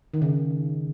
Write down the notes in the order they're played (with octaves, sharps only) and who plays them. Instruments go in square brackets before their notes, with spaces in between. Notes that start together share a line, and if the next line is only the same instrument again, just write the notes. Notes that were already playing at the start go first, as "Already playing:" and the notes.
[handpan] D#3
C#3